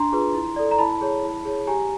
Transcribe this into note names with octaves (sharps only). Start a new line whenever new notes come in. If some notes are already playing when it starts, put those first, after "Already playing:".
Already playing: D4 A#5 C6
F4 G#4 B4
E4
A4 D5
A#5
E4 A5 B5
G#4 C#5
E4
G#4 C#5
G4 G#5 A#5